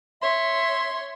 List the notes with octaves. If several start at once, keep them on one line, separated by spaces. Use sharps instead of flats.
C#5 E5 C6